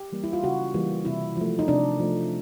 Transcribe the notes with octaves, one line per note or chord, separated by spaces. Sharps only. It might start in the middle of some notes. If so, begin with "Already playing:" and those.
Already playing: G4
E3 G3 A#3
E4
F4
C#3 F#4
E3 G3 A#3
C3 E4
F3 A3
D#4
C3 D4
F3 A3